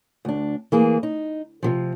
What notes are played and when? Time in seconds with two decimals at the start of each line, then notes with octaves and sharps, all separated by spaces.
0.25 D2 D4
0.72 E3 A#3 G#4
1.03 D#4
1.63 C3 D#3 F3